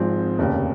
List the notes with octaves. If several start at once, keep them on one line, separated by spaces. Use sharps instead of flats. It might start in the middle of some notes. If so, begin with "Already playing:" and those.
Already playing: G#1 G#2 F3 G#3 C4
F1 D#2 C#3